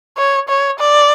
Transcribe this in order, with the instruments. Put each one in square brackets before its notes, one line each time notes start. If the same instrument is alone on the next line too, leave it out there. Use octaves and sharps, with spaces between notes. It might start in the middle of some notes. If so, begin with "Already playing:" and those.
[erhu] C#5
C#5
D5